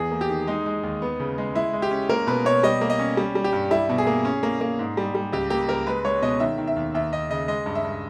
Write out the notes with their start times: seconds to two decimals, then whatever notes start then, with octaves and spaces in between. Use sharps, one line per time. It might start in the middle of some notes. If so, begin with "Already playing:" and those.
Already playing: E2 E3 G#4
0.11 A#3
0.21 G4
0.30 D#3
0.47 G#3 D#4
0.66 G#3
0.83 D#2
1.02 B3
1.20 C#3
1.38 G#3
1.55 G#3 E4
1.73 G#3
1.82 G4
1.91 C#4
2.09 A#3 A#4
2.27 B2 B4
2.45 B2 C#5
2.63 G3 D#5
2.81 A#3
2.90 D#5
2.99 C#4
3.17 G3
3.35 G3
3.44 G4
3.53 G2
3.71 G3 E4
3.89 B2
3.98 G#4
4.07 A#3
4.25 C#4
4.43 A#3
4.61 A#3
4.79 G#2
4.97 G3
5.15 G3
5.32 C#2 G4
5.50 A#3 G4
5.69 C#2 A#4
5.87 G#3 B4
6.05 G#3 C#5
6.22 B2 D#5
6.40 D#3 E5
6.58 D#3
6.67 E5
6.76 D#2
6.94 D#2 E5
7.13 D#2 D#5
7.30 C#3 D#5
7.48 G#3 D#5
7.66 G2
7.75 E5
7.84 G2